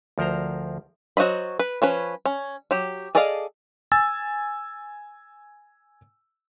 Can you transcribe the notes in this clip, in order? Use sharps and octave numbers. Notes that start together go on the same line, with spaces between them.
D2 F3 A#4 C5 A#5
F#3 F#4 C5 D#5 B5
B4
F3 C#4 B4
C#4
F#3 G4
G#4 A4 D5 D#5 F5
G#5 E6 A6